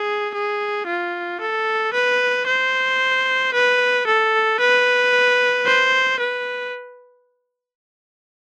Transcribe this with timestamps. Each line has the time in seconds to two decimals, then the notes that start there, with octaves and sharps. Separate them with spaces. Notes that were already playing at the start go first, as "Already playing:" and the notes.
Already playing: G#4
0.34 G#4
0.87 F4
1.41 A4
1.93 B4
2.47 C5
3.54 B4
4.07 A4
4.60 B4
5.66 C5
6.20 B4